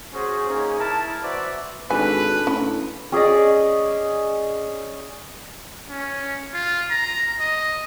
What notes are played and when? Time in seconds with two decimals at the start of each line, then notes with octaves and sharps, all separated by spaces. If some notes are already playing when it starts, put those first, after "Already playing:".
0.13 C#4 F#4 G#4 C5
0.49 A#3 C#4 D#4 G#4
0.79 E4 A#4 A5
1.23 F#4 B4 C5 D5 E5
1.90 G#1 D4 F#4 A4 B4 G#5
2.47 A2 C#4
3.12 C#4 G#4 D5 D#5
5.89 C#4
6.54 F4
6.90 A#5
7.40 D#5